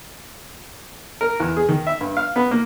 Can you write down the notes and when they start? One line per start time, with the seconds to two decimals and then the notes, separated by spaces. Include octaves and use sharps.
1.21 A#4
1.40 E2
1.57 G#4
1.69 D#3
1.87 E5
2.01 G2
2.17 F5
2.36 B3
2.51 A#3